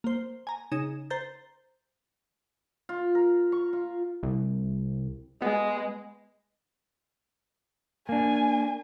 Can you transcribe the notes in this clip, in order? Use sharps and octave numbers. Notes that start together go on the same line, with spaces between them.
A#3 C5
G#5 A#5
C#3 D#4 G#4 E7
C5 A#5 G6 A6
F4
A#4
C#6
F4
C2
G#3 B3
A#3 D4 G#5